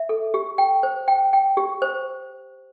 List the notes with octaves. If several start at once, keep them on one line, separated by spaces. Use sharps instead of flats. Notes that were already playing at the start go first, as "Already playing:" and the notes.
Already playing: E5
A4
G4
G5
C5
G5
G5
G4
C5